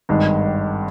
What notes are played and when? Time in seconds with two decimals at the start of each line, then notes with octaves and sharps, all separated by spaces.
0.09 G#1 G2 D#3 G#3